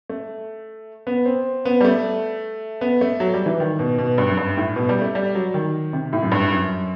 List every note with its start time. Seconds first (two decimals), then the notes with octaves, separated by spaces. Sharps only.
0.09 A3
1.07 B3
1.26 C4
1.65 B3
1.81 G3
1.85 A3
2.81 B3
3.01 A3
3.20 F#3
3.33 G3
3.46 E3
3.60 D#3
3.79 B2
3.98 B2
4.18 G2
4.29 F#2
4.37 G2
4.57 A2
4.76 B2
4.89 G3
5.02 A3
5.15 G3
5.35 F#3
5.54 D#3
5.93 C3
6.13 A2
6.22 F#2
6.32 G2
6.51 F#2